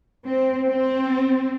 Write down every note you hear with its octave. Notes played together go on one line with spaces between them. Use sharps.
C4
C4